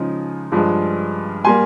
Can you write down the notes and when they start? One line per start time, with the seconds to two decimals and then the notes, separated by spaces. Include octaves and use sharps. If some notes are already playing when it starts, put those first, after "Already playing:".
Already playing: C#3 F3 G#3 D#4
0.52 G2 F3 G#3
1.45 G3 A#3 G#5 C6